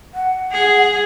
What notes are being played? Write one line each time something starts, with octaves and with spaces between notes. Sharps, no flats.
F#5
G#4